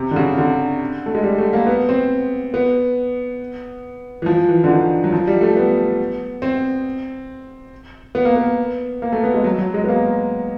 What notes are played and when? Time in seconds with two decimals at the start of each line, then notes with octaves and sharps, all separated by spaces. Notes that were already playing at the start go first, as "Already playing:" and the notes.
Already playing: C3
0.11 D3
0.16 C#3
0.37 D3
1.06 A3
1.15 G#3
1.23 G3
1.38 A3
1.53 A#3
1.66 B3
1.89 C4
2.54 B3
4.22 E3
4.26 F3
4.48 E3
4.64 D3
4.70 D#3
5.04 F#3
5.12 F3
5.27 G3
5.41 A3
5.56 B3
6.42 C4
8.15 B3
8.25 A#3
8.36 B3
9.02 A#3
9.12 A3
9.24 B3
9.34 G#3
9.44 F#3
9.58 F#3
9.74 G#3
9.84 B3
9.88 A#3